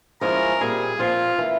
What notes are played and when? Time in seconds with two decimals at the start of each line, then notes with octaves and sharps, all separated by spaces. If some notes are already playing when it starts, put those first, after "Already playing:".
0.21 F3 G#3 C#4 E4 A#4
0.60 A#2 G3 C4 G#4
0.99 A#2 F3 C4 F4
1.38 E3 A#3 E4